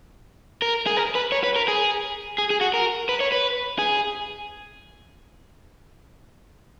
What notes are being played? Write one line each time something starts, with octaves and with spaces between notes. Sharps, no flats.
A#4
G#4
A#4
B4
C#5
B4
A#4
G#4
G#4
G#4
F#4
A#4
B4
C#5
B4
G#4